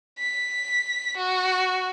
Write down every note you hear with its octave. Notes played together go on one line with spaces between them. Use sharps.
B6
F#4